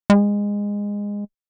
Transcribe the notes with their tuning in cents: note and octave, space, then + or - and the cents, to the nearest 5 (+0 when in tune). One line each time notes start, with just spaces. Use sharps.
G#3 -20